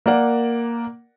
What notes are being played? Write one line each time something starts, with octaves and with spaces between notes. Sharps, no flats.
A#3 A#4 D5 F#5